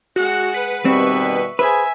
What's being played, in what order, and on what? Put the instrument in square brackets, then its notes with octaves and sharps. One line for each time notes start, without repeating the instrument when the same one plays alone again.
[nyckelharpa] G#3 F#5 [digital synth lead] F#4
[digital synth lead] B4
[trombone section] B2 D#3 G3 [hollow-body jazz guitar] C4 [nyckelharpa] E5 C#6
[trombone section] G#4 C5 [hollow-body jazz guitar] B4 [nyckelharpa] E5 G#5